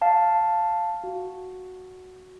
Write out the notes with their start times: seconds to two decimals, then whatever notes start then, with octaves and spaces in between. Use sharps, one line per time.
0.01 F5 A5
1.04 F#4